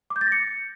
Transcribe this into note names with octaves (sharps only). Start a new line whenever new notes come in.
D6
G6
A6
A#6
C#7